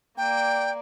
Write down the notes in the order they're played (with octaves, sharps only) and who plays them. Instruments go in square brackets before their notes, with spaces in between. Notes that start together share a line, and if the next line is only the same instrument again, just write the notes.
[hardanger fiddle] A#3 D5 [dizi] G5